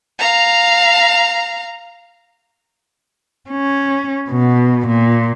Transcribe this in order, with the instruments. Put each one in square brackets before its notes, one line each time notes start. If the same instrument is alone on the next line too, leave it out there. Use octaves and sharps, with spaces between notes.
[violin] F5 A#5
[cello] C#4
B2
A#2